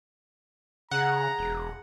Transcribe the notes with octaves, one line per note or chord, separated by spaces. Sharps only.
C#3 G#4 F#5 A#5
E1